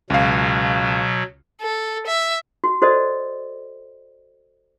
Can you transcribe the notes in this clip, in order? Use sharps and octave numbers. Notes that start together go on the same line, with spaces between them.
C#2 B2 F#3 F5
A4
E5
F#4
F#4 A4 C5 D5 D#5